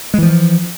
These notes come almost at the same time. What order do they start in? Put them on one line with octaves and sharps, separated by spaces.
G#3 E3 F3